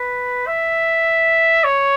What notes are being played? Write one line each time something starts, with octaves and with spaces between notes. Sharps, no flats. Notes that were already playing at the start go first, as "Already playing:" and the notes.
Already playing: B4
E5
C#5